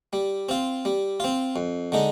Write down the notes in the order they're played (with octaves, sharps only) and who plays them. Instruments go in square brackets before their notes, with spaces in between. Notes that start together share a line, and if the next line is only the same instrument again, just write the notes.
[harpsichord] G3
C4 F4
G3
C4 F4
F2
D3 G#3 D#4